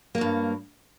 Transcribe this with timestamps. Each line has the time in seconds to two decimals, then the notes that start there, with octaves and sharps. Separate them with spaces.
0.15 A#3
0.18 F#3
0.21 G2